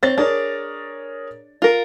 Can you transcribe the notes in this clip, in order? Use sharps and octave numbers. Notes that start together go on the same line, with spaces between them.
C4 C5 C#5 A6
D4 G#4 A#4 C#5
F4 A#4